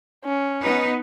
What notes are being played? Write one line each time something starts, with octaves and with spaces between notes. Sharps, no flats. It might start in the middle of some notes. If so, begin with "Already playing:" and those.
C#4
B3 D#4 B4